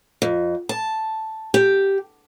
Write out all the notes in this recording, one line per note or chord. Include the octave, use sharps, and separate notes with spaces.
F2
A5
G4